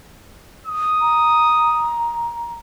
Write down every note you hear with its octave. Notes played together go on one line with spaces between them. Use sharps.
D#6
A#5